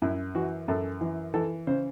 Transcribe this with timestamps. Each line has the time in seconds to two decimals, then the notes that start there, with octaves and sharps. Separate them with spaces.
0.02 F#2 E4
0.35 E3 F#4
0.68 F#2 A4
1.01 E3
1.34 E3 A4
1.67 C#3 C5